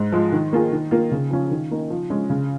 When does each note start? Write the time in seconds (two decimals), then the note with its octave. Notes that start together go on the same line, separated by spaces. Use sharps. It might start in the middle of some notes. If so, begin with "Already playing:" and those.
Already playing: G#2
0.12 F3 G#3
0.32 D#3
0.53 A#3 F4 G#4
0.72 D#3
0.91 A#3 F4
1.11 C#3
1.31 F3 C#4
1.51 D#3
1.71 A#3 D#4
1.90 F3
2.10 G#3 C#4
2.30 C#3